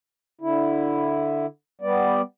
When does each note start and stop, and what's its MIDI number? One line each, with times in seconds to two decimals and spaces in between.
0.41 1.46 50
0.41 1.46 64
1.81 2.21 55
1.81 2.21 59
1.81 2.21 74